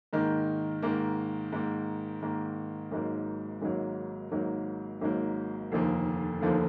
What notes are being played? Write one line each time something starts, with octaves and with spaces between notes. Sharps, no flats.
G#2 D#3 A#3
G#2 D#3 A#3
G#2 D#3 A#3
G#2 D#3 A#3
G#1 G#2 F#3 A#3
G#1 G#2 F#3 A#3
G#1 G#2 F#3 A#3
G#1 G#2 F#3 A#3
F1 D#2 D3 F3 A#3
F1 D#2 D3 F3 A#3